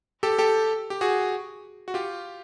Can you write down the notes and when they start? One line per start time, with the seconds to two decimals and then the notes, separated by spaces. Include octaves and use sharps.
0.23 G4 A4
0.38 G4 A4
0.90 G4
1.01 F#4 G#4
1.88 F#4
1.94 F4 G4